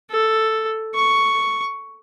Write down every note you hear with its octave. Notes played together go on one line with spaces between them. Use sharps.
A4
C#6